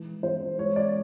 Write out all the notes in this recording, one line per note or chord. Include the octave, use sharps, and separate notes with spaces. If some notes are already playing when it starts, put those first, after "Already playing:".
Already playing: E3 G#3
E3 C5
G#3 C#5
D5